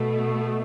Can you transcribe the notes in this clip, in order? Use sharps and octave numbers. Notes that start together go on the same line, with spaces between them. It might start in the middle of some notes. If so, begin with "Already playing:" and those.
Already playing: B2 A3